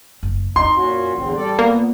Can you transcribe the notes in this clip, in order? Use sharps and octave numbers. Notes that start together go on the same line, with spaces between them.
F#1
F2 D#4 C6
A#2 C#4 F#4
A1 E2 D3 C4
G3 A4 D5
A#2 A#3 B3